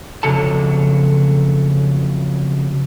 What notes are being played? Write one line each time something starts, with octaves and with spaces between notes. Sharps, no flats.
F2 G#2 C#3 F#3 A4 A5